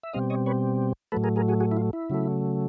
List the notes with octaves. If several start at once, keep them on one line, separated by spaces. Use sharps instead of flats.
E5
B2 G3 C4 D#5 F5
C#5 D#5
B4 C#5
A2 F#3 A3 A4 B4
G#4 A#4
G#4 A#4
F#4 G#4
F#4 G#4
E4
F4
E4
C#3 F#3 A3